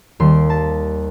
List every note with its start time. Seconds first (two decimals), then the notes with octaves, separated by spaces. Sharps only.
0.20 D#2 D#3 G3 C6
0.50 A5